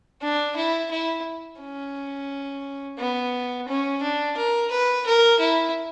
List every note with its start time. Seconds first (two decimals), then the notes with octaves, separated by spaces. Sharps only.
0.22 D4
0.56 E4
0.91 E4
1.60 C#4
2.98 B3
3.68 C#4
4.02 D4
4.37 A#4
4.71 B4
5.06 A#4
5.40 E4